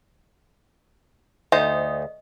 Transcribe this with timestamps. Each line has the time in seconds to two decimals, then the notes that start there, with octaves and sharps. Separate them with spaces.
1.52 D2 D#4 C5 D#5